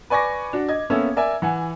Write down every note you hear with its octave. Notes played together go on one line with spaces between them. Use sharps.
B4 D5 G#5 C#6 D6 A#6
D4 F#4
D#5 G#6
A#3 B3 C#4 A4 E5
A#4 D5 E5 G#5
E3 F#5 G#5